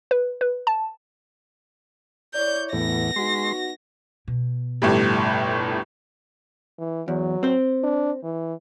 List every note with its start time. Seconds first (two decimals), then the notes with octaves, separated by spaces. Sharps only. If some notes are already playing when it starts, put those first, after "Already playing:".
0.11 B4
0.41 B4
0.67 A5
2.34 E4 C#5 D5 G6
2.73 E2 A2 B3 A#6
3.16 G#3 B3 D#4 F#4 C6
4.28 B2
4.82 G1 A2 G3
6.79 E3
7.08 E2 F#3
7.43 C4 C5
7.84 D4
8.24 E3